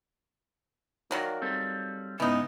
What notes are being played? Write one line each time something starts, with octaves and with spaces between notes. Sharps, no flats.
D#3 F#3 A#3 A#4 D5 F#5
G3 C4 A4
C#2 G#2 C#3 E3 B3 D#4